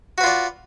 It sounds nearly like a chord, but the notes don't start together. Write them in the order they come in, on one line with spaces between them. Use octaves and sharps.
F#4 B4 F4 D5